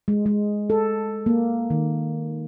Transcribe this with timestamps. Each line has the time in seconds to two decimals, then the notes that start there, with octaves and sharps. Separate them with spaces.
0.08 G#3
0.26 G#3
0.70 A4
1.26 A#3
1.70 D#3